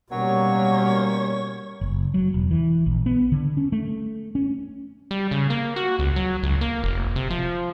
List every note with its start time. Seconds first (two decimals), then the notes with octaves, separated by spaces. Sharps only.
0.12 B2 F#3 G3 A#3 C#4 C#5
1.81 F#1
2.14 F#3
2.34 E1
2.51 E3
2.86 A#1
3.06 B3
3.32 D3
3.57 C#4
3.72 A3
4.35 C#4
5.11 G3
5.31 C#3
5.50 A#3
5.76 F#4
5.99 C#2
6.16 F#3
6.43 C#2
6.61 A#3
6.84 F1
7.16 C3
7.30 F3